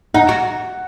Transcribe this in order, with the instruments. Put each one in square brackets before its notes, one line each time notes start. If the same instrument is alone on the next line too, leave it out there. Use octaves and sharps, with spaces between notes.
[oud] D#4 [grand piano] F#5
[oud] F#4